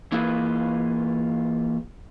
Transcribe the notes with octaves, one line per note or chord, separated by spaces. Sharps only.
E3 A#3 E4 F4 G#4 B4